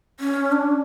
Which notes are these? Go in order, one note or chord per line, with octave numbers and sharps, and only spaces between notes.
C#4
D4